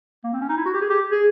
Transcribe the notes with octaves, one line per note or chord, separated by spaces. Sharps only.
A#3
C4
C#4
D#4
E4
F#4
G4
G#4
G4
G#4